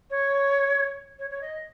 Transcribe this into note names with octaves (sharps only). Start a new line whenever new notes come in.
C#5
C#5
C#5
D#5